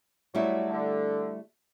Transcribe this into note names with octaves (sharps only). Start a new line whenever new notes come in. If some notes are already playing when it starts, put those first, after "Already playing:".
F#3 G3 A3 E4
D3